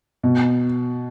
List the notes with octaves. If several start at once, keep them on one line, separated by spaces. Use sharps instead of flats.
B2